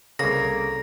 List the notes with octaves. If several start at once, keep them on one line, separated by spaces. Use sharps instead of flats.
C2 C#3 A#3 G#4 A4 A#6